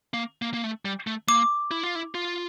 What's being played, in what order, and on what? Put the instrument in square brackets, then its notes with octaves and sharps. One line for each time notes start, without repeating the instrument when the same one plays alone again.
[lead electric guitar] A#3
A#3
A#3
A3
G3
A3
[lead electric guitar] A#3 [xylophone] D6
[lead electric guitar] E4
F4
E4
F4